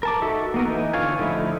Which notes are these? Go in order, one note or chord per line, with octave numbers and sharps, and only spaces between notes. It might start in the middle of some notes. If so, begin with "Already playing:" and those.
A#4 A5 D6
D#4 F#4 A4 E5
A#3 B3 A#4
E3 D#4
D3 F4 C#5 F5 G#5
D3 F3 A3 D#4 E4